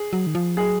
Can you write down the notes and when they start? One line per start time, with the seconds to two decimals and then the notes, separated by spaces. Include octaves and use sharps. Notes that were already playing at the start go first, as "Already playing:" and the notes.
Already playing: G#4
0.13 F#3
0.27 D#3
0.35 F3
0.57 F#3 G#4